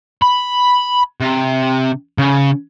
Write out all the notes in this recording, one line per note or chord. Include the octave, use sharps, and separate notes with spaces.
B5
C3
C#3